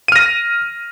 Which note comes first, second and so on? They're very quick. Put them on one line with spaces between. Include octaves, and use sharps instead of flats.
D#7 F6 A#6